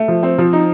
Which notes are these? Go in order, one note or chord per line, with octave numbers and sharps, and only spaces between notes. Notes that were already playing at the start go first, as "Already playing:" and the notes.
Already playing: A3
F3
C4
F3
D#4